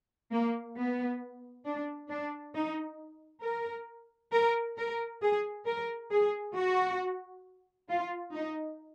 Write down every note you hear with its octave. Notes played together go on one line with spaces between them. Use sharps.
A#3
B3
D4
D4
D#4
A#4
A#4
A#4
G#4
A#4
G#4
F#4
F4
D#4